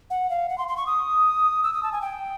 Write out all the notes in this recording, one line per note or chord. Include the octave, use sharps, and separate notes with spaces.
F#5
F5
F#5
C6
C6
C#6
D#6
E6
D#6
A5
G#5
G5